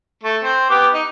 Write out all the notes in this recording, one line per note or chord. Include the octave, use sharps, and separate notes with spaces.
A3
C4 C5
B3 G4 D6
D#4